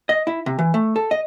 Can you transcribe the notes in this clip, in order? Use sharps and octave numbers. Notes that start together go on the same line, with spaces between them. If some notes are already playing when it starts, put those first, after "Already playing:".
D#5
E4
C3
E3
A3
A4
D#5